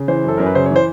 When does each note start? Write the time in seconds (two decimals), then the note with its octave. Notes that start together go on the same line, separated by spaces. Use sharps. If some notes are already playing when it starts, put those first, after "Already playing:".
Already playing: C#3
0.08 E3 C5
0.24 F#2 A4
0.37 F#2 A#4
0.46 B4
0.55 C#3 C5
0.66 C#5
0.71 E3 C5